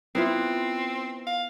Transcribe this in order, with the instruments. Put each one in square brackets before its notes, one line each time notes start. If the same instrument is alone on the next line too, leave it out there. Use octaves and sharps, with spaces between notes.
[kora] B3 E4 F4 [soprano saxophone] C4
[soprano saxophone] F5